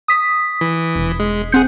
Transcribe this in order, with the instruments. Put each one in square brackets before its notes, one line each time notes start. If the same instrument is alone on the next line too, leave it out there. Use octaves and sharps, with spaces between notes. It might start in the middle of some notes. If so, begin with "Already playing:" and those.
[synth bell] D#6 B6
[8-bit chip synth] E3
[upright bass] E1
[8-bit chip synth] G#3
[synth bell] C4 G6 [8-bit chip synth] G#4 F#5 C#7